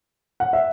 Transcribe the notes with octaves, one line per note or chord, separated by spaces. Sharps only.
F#5
E5